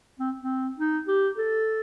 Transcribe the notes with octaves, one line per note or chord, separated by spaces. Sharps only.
C4
C4
D#4
G4
A4